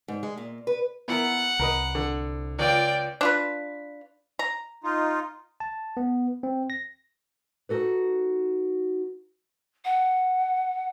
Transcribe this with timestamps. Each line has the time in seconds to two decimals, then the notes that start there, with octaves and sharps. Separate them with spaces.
0.08 G#2
0.23 G#3
0.38 A#2
0.67 B4
1.08 B3 E4 A#4 F#5
1.59 C2 A#4 B4 D#5
1.95 D3
2.59 C#2 F4 D5 G5
3.21 D4 F4 B4
4.39 A#5
4.84 D#4 F4
5.60 A5
5.97 B3
6.43 C4
6.70 A#6
7.69 D#4 F#4 A4 B4
9.85 F#5